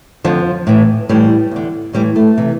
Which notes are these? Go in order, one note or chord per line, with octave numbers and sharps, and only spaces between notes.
F2 D3 F3
A2 E3
A2 E3 G3
E2 D3
A2 E3 G3
A3
C3 E3